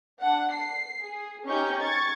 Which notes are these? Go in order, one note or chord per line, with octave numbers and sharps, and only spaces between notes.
D4 F#5
C7
G#4
C#4 D#4 G4 C#6 G6
C#6 G#6 A6